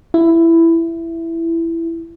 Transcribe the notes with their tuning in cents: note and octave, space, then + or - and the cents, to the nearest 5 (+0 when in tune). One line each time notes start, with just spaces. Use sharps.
E4 +10